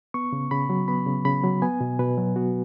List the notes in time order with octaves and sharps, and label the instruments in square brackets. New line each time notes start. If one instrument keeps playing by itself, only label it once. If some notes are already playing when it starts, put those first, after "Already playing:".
[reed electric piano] B3 C#6
C#3
C#3 B5
F#3
B3 B5
C#3
C#3 B5
F#3
B3 G#5
B2
B2 B4
F#3
B3 F#4